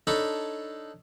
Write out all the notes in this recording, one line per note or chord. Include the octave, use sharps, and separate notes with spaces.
D4 D#4 A4 C#5 B5